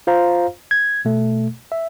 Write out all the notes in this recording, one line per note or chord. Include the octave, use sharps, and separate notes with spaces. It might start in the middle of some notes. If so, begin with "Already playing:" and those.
F4 C5 F5 A#5
G#6
B2 A3
E5